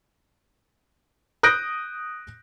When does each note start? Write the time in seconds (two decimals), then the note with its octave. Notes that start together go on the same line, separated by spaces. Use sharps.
1.43 D#6 F#6 G6 A#6 D7